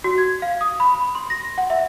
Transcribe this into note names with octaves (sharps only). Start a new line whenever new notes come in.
F#4
G#6
F5
D#6
B5
B5
C6
A#6
F#5
E5